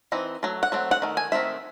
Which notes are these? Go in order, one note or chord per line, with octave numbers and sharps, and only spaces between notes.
E3 C4 D#4
F#3 A3
F#5
F#3 A3 C4
F#5
D#3 A3
G#5
D#3 A3 C4 E5